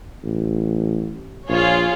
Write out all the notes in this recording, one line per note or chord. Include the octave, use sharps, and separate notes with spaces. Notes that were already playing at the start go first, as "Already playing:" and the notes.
A1
A#1 F4 G#4 C#5